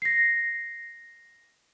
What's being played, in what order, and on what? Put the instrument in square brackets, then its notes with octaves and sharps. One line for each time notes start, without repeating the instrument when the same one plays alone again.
[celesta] A#6 C7